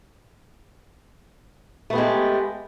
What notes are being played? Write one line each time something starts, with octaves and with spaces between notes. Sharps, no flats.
G#3 A3 B3 G4